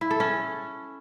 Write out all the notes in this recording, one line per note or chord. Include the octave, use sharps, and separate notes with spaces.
E4
A4
C#4